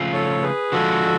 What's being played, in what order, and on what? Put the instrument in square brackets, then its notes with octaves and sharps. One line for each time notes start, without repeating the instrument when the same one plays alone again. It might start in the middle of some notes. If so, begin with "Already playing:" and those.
Already playing: [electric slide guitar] C#3 F3 A3 F4
[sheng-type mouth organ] A4 C#5
G#4 B4
[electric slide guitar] D3 F3 G#3 [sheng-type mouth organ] F#4 A4